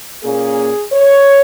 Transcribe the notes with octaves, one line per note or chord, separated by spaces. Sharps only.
A#2 A#3 C#4 G#4
C#5